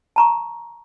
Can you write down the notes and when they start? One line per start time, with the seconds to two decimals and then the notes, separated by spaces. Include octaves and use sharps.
0.16 A5 A#5 C#6